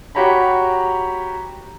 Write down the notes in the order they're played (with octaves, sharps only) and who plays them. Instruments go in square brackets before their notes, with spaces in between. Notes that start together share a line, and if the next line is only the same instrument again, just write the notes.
[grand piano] F#4 G4 C#5 A#5 B5